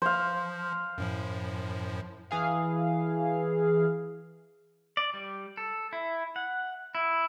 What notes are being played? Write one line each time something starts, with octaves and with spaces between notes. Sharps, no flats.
F3 C5 F5
F#2 A2 F3
E3 G#4 F5
D5
G3
A4
E4
F#5
E4